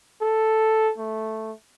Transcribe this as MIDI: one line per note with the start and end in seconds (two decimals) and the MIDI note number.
0.21 0.91 69
0.98 1.52 57